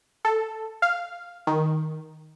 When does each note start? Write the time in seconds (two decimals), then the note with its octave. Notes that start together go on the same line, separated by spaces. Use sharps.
0.25 A4
0.82 F5
1.47 D#3